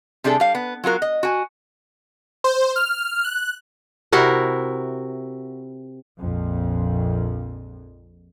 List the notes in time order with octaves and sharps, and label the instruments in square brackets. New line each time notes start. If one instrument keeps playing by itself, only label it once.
[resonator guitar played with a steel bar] C3 G3 D4 G#4 A4
G3 F5
B3
F#3 F4 F#4 A#4
D#5
F#4 G#5
[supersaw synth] C5
F6
F#6
[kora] C3 E4 F#4 A#4
[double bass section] A#1 F2